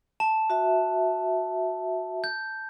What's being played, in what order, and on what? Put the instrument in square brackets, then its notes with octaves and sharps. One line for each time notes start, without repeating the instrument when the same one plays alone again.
[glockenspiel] A5
[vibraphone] F#4 E5
[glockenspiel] G6